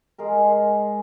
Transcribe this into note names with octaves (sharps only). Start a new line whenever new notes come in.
G#3 G#4 A#4